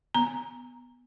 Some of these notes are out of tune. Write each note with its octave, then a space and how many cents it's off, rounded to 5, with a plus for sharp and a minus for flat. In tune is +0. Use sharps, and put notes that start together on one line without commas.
B3 +0 A#5 +0